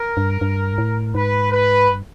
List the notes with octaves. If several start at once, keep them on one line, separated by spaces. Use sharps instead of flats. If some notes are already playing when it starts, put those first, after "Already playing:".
Already playing: A#4
G2
G2
G#2
A2
G#2 B4
B4
G2